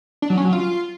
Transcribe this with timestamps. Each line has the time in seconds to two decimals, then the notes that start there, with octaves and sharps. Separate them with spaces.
0.22 D4
0.30 F#3
0.37 C#4
0.45 F#3
0.53 F4